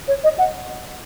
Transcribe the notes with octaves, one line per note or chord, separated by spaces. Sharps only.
C#5
D#5
F#5